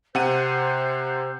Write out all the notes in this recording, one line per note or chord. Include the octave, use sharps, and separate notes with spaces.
C3 C5 F#5 G6 D#7